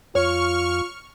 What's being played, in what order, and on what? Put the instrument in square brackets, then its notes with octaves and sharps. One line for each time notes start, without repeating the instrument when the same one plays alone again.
[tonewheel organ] F2 [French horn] F4 [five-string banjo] C#5 [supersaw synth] C#6 F6